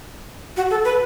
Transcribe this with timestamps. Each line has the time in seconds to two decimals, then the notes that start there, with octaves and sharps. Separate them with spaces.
0.57 F#4
0.71 A4
0.85 B4